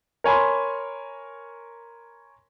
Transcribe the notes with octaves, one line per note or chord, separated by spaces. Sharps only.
A#4 C#5 G#5 B5 C6